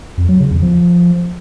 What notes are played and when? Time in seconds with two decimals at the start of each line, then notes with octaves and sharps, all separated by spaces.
0.18 F2
0.29 F#3
0.40 C#3
0.51 E2
0.62 F3